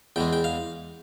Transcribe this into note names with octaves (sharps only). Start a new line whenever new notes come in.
E2 E3 G#3 G5
G5
F5